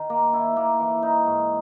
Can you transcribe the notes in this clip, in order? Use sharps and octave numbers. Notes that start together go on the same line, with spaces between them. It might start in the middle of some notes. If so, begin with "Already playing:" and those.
Already playing: D#3
A#3
E4
A#3
E3
D#4
G#2